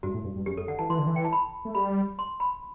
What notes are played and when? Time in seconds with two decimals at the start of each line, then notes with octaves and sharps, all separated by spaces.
0.03 G2 F#4
0.14 A2
0.25 G2
0.36 G2
0.46 F#2 G4
0.57 F#2 A4
0.68 D3 F#5
0.79 E3 A5
0.90 E3 C6
0.98 D3
1.07 E3
1.16 G5
1.25 A5
1.33 B5
1.65 A3
1.75 G3 B5
2.19 C6
2.40 B5